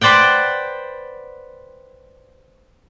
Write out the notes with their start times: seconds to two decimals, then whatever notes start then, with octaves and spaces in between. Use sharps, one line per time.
0.01 B4 C5 D5 F#5 G5